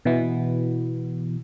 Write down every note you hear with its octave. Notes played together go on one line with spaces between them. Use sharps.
B2 E3 B3